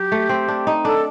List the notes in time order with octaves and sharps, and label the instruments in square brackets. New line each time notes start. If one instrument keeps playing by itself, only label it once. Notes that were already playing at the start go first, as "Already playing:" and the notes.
Already playing: [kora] F#3 [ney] G4
[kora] A3
C4
D4
D#4
[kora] D4 [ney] A4